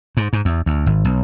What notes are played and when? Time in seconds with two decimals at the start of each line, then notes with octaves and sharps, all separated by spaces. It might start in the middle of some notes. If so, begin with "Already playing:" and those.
0.17 G#2
0.33 G#2
0.45 E2
0.66 D2
0.86 G#1
1.05 B1